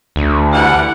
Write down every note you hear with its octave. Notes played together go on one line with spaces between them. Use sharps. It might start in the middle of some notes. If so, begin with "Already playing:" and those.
D2
E3 G3 F#5